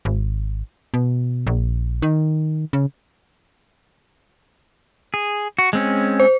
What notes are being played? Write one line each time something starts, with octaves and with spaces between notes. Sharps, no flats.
G#1
B2
A#1
D#3
C#3
G#4
F#4
G#3 C4 C#4
C5